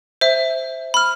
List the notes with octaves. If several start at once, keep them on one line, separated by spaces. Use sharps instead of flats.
C5 E5
B5 F6